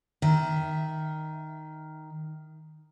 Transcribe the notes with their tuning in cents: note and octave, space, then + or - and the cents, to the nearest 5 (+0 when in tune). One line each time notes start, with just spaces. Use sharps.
D#3 +0 E5 +0